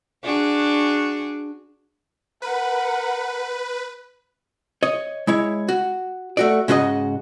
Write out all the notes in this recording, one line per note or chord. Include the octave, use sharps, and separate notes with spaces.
D4 F#4 G#4
A#4 B4 F#5
C#5 D#5
G#3 E4 C#5
F#4
A3 F#4 D5
G#2 C#3 F#4 B4 D#5